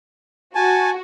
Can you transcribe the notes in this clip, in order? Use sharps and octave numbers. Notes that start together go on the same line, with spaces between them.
F#4 G#5 A5